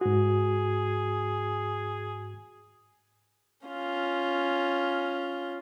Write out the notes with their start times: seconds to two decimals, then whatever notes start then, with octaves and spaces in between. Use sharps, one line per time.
0.01 G#2 F#4 G#4
3.67 C#4 F4